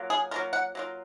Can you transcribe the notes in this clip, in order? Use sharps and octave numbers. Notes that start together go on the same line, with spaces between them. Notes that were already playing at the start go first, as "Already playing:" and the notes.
Already playing: F#3 A#3 F4
G#4
F#3 A#3 F4 A#4
F#5
F#3 A#3 F4